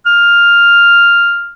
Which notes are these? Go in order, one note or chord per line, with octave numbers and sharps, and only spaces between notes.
F6